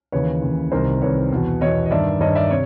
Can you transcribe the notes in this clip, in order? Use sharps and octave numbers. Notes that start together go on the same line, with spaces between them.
D#2 C#3 E3 B4 C#5
D#2 C#3 E3
C2 C3 D#3 A#4 C5
C2 C3 D#3 B4 C#5
E2 B2
E2 B2 C#5 D#5
D#5
G2 D#3 D5 E5
G2 D#3 C#5 D#5
D5 E5
C3 C#5